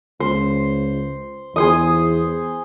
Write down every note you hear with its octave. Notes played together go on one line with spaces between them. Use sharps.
C#2 C5
E2 G#4 C5 D#6